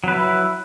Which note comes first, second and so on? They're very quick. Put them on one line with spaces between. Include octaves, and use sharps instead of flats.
F#3 B4 E4